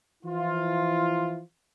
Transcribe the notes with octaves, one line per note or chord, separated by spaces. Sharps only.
E3 F3 E4 F4